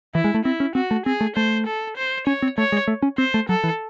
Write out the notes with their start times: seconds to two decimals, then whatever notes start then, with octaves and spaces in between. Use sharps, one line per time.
0.15 E3 E4
0.24 G#3
0.34 A3
0.45 C4 E4
0.60 C#4
0.75 C4 F#4
0.91 A3
1.06 C4 G#4
1.21 A3
1.36 A3 C5
1.67 A4
1.97 C5
2.27 C#4 C#5
2.42 C4
2.58 A3 C#5
2.72 G#3
2.88 A3
3.02 C#4
3.18 C4 C5
3.34 A3
3.49 F#3 A4
3.64 E3